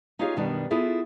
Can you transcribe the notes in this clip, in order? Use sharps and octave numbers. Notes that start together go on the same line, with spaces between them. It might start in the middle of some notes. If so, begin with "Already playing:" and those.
D#4 F4 G4 G#4 C#5 F5
F#2 B2 D#3 G3 B3 D4
B3 E4 F4 G#4 A4